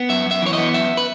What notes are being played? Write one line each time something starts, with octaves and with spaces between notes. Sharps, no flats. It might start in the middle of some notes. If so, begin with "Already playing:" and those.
Already playing: B3
F#2 E5
F#2 E5
E3 C#5
B3 D#5
F#2 E5
B4